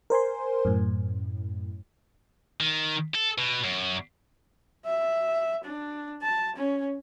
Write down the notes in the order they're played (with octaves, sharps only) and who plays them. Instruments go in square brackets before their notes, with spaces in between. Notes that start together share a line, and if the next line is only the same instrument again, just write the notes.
[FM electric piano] A#4 C5 G#5 C6
F#2 A2
[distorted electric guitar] D#3
A4
B2
F#2
[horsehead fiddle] E5
D4
A5
C#4